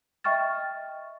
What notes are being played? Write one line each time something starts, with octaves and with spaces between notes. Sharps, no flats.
D#5 E5 G5 C#6 F6 A6